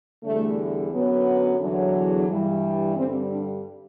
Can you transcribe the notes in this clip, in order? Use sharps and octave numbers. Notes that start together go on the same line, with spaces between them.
E2 D3 G3 A3
F#2 D3 F#3 B3
E2 D3 F#3
G2 E3 G3
G2 D3 G3 C4
D4